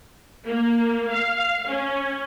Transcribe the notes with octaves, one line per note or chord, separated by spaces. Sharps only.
A#3
F5
C#4